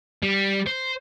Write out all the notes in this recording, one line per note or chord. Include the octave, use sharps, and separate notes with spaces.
G3
C5